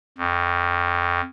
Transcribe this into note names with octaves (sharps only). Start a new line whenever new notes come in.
F2